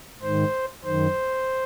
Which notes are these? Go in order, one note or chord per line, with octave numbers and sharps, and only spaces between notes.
G#2 D#3 C5
F#2 D#3 C5